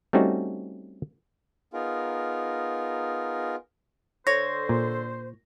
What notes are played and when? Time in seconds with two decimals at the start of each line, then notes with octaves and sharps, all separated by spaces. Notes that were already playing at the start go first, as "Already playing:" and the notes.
0.13 G3 A3 C4 C#4 D#4 F#4
1.73 B3 D#4 F4 G#4 A#4
4.27 D3 A4 C5 C#5 A#6
4.69 A#2